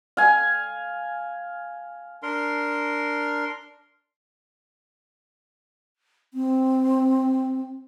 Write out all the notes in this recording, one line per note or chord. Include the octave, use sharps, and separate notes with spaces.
F5 G#5
D4 A#4 C6
C4